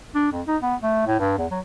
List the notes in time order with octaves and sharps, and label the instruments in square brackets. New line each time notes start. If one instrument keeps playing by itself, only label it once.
[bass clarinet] D4
F2
D#4
B3
A3
A2
G2
E2
F#3